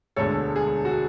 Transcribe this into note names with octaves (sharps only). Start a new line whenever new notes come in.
E1 D2 D3 G#3 A4 C#5
G#4
F#4